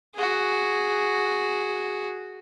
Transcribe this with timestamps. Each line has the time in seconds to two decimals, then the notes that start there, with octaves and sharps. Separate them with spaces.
0.14 F#4 G#4